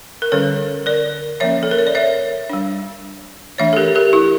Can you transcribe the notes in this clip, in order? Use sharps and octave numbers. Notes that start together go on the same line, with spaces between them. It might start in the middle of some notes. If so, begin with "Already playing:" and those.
A#4
D3 G3 C#4 A4 C#5
A#4 D5
F3 A#3 C#4 C#5 E5
A4
A#4
C#5
D5
C#5 E5
G3 D4
E3 A3 D4 C#5 E5
A4
G4 A#4
G4 A#4
E4 G4